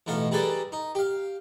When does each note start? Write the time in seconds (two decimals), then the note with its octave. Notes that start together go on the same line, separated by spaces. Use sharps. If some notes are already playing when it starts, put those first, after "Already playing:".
0.06 A1 B2 D#4 A4 F5
0.31 G3 D#4 G#4 A4 B4 D5
0.72 D#4
0.95 G4 F5